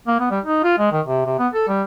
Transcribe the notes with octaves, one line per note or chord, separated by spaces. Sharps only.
A#3
B3
G3
D#4
F4
G#3
D#3
C3
C3
B3
A4
G3